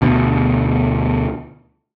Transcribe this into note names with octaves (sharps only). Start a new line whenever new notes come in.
D2 B2